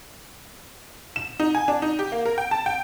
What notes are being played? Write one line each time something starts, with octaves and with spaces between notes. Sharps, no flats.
E7
D#4
G#5
D4
D#4
G4
A#3
A#4
G5
A5
G5